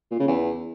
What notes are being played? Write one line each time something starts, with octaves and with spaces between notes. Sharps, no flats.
A#2
C#3
E2